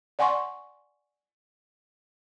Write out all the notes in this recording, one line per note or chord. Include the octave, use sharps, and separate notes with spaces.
D5 F#5 G#5 C6 C#6